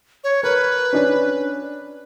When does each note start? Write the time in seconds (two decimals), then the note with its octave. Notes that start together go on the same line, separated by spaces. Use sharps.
0.24 C#5
0.43 A#4 B4
0.93 C#4 D4